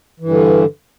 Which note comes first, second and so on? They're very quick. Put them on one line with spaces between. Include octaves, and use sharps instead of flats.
E3 G2 D3